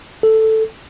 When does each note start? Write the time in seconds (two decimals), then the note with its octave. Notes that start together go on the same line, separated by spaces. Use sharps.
0.23 A4